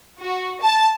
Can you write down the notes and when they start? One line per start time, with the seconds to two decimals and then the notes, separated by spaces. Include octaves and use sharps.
0.20 F#4
0.61 A5